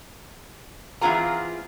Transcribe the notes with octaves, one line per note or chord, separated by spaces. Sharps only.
E3 B3 C4 F4 G#4 A#5